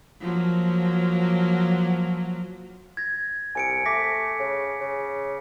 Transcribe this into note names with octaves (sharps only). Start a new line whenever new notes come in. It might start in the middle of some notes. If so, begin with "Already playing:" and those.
F3 F#3 A#3
G#6 A#6
C2 G#5 C#7 D7
A3 D6 A#6 B6
C#3
C#3